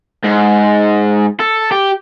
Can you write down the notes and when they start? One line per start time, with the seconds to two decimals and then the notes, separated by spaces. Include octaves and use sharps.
0.24 G#2
1.40 A4
1.71 G4